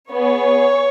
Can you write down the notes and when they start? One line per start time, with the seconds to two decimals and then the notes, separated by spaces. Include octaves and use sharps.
0.10 B3 G#4 C#5